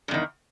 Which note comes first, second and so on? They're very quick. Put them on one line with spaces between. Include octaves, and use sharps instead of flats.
G2 E2 D#3